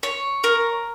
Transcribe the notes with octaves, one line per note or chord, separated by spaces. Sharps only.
C#5
A#4